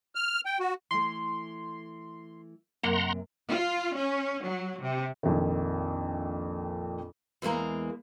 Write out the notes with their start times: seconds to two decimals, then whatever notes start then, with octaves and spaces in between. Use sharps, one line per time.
0.15 F6
0.46 G5
0.59 F#4
0.91 E3 A3 C6
2.83 F#2 C3 A#3 F#5 A#5 C6
3.49 F4
3.96 C#4
4.45 F#3
4.82 C3
5.23 A#1 F2 D#3
7.42 E2 E3 G#3 A#3 A#5